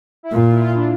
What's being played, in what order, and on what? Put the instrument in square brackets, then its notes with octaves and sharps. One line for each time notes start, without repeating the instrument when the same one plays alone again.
[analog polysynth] E4
[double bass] A#2 [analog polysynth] F4
[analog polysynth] E4
F4
D4